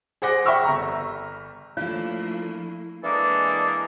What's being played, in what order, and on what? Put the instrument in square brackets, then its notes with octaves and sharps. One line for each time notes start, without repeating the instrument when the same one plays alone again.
[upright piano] G#4 C5 F#5 D6 A#6
E5 G5 B5 C#6 E6 F6
G1 A#5
[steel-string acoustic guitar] F3 D4 [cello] A3 A#3 [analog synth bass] E4 [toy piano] C#5 F5
[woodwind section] E3 G#3 A#3 D4 A4